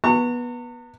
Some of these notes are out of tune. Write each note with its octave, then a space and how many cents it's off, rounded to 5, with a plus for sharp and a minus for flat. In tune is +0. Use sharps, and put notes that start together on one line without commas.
B3 -20 A#5 -45 C#6 +0